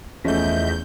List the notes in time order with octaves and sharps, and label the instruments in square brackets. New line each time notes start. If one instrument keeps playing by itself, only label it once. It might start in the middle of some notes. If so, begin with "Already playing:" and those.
[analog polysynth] E2 G6 [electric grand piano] F3 A3 [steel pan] C#4 [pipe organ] D#5 E5